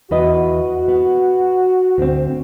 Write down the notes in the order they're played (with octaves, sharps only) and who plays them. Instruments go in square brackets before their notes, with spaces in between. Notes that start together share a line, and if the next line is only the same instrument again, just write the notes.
[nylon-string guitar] E2 B4 D#5 [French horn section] F#4
[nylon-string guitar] B3
D2 C4